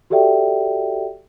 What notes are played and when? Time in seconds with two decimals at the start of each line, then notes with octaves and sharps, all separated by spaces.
0.10 F#4 G4 A4 D5 E5 G5